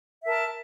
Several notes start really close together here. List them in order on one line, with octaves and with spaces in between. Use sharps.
E5 A#4 A5